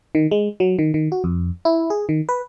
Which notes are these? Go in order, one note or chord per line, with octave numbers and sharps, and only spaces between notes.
D#3
G#3
F#3
D#3
D#3
F#4
F2
E4
G#4
D#3
B4